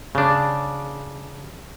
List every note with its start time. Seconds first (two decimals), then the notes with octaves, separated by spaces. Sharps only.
0.15 C#3 D4